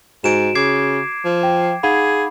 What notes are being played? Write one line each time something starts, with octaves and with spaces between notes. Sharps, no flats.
G#2 F#4 D7 E7
C#3 D6 G#6 C7
F3
G5
D#4 G#4 F5 F#5 B5